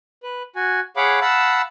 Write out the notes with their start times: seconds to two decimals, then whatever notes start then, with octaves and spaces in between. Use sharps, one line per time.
0.23 B4
0.56 F#4 G#5
0.96 G#4 C#5 F5 F#5 B5 D6
1.21 F5 F#5 A5 B5 E6